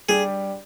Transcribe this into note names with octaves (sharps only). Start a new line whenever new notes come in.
G3 D4 G4 G#4 D5